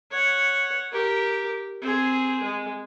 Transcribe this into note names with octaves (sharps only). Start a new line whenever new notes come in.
C#5 F#5
G4 A#4
C4 G#4
G#3